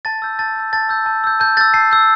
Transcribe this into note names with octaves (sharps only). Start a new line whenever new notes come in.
A5 A6
E6 G6
A5 A6
E6 G6
A5 A6
E6 G6
A5
E6 G6
A5 G6
E6 G6 A6
A5 C7
E6 G6